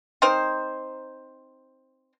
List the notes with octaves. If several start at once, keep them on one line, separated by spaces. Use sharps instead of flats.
C4 D#4 A#4 C5